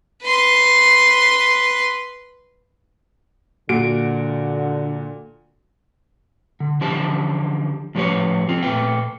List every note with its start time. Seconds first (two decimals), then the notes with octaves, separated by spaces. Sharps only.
0.23 B4 C6
3.69 A#2 D3 F#4 D7
6.60 D3
6.81 D3 E3 F3 G4 C5 A5
7.95 A2 F3 A3 G4 B4 C#5
8.49 F3 C4 F4
8.63 A#2 A3 B4 G5